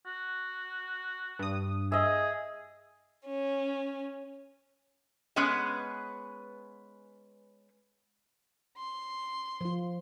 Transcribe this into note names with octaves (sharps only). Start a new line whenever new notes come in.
F#4
G2 D#6
G#4 D#5 E5
C#4
G#3 B3 C#4 B4 D#5
C6
F3 F4